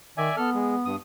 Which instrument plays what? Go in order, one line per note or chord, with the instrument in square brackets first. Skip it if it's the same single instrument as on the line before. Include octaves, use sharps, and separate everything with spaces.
[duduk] D#3 [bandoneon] D5 E5 G#5
[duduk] B3 [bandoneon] A4 F6
[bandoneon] G#3
G2 D#6